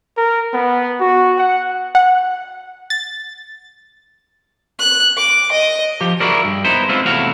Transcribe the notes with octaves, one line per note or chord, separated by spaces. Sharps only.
A#4
B3
F#4
F#5
F#5
A6
F#6
D6
D#5
F3 G4
E4 F#4 G#4 A#4 D5
G2
B3 D#4 E4 C5
G#3 C4 E4 F4
E2 A2 C3 E4 F#4 F5